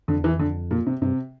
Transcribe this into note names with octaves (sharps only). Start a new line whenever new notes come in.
F2 D3
E2 E3
F2
D3
A#2
C3
G2 C3